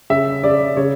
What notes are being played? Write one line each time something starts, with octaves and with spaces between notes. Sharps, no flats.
C#3 E5
C#3 D5
C#3 C#5